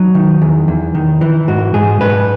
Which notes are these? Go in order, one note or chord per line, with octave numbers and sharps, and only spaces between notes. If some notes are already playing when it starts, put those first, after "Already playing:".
Already playing: F#3 D#4
D#3
E2
E2
D#3
E3
G#2 F#4
G#2 G#4
G#2 B4